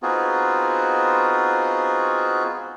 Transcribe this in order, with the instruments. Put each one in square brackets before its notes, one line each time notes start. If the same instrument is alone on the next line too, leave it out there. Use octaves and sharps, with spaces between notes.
[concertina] B3 C4 D#4 F4 F#4 G#4